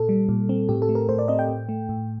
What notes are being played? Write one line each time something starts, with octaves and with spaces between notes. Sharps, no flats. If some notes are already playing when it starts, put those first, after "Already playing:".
Already playing: A#2 A4
G3
A#2
C4
A2 G4
A4
A3
A#4
A2 C5
D5
C4 D#5
G5
A2
A3
A2